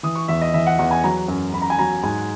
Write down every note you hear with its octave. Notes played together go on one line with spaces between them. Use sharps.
E3 D#6
C#6
E2 E5
D#5
E3 E5
F#5
E2 F#5
G#5
F#3 A#5
F#2
F#2 B5
A#5
G#5
F#3 A#5
G#2 G#5